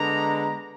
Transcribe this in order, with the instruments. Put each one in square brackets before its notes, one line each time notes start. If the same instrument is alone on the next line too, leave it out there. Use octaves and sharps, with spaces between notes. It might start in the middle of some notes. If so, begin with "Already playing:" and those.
Already playing: [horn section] D3 G#3 B3 A#5